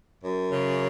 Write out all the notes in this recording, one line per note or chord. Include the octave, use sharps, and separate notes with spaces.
F#2
C#3